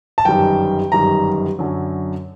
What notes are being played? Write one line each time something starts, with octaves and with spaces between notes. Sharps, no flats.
A5
G1 F#2 D#3 G3 G5
G1 F#2 D#3 G3 A#5
F#2 D3 F#3